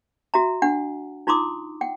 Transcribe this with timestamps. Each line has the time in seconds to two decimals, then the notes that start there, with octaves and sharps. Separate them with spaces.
0.34 F#4 E5 A#5
0.62 D4 F#5
1.27 D#4 F4 A#5 C6 D6 D#6
1.81 F#5 G5